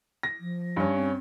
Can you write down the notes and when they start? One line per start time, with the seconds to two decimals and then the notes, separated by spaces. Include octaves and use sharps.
0.23 A#6
0.40 F3
0.76 G2 C#4
0.95 C4